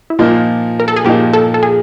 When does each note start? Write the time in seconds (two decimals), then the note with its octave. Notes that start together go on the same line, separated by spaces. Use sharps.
0.10 E4
0.19 A#2 F3 A#3 D#4 F4
0.80 A#4
0.88 A4
0.96 G#4
1.04 A#2 F3 A#3 D#4 G4
1.34 A4
1.54 A4
1.63 G#4